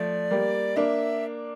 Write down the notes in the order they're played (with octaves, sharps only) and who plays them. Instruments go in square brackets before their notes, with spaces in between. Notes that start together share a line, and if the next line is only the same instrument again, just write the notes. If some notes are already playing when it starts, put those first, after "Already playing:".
Already playing: [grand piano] F3 A3 [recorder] D5
[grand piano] G3 A#3
[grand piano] A#3 D4 [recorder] E5